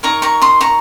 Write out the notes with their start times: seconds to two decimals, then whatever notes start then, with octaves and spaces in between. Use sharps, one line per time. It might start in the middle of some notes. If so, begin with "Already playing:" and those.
0.03 D#4 A#4 C#5 A#5 C#6
0.22 A#5 C#6
0.41 C6 D#6
0.61 A#5 C#6